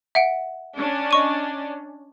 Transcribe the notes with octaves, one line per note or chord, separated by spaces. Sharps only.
E5 F#5 D7
C#4 D4
D#5 C#6 D#7